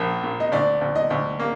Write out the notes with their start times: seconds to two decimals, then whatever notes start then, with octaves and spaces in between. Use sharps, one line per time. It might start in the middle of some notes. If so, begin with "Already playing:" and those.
Already playing: A#1 A#2
0.23 A#2
0.40 D#5
0.52 D2 D5
0.81 D2
0.96 D#5
1.10 D2
1.39 A#3